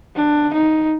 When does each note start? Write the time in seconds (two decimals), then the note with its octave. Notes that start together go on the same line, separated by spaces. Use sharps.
0.16 D4
0.54 D#4